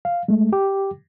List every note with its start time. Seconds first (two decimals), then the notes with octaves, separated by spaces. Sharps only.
0.05 F5
0.28 G#3 A3
0.52 G4 G5 D6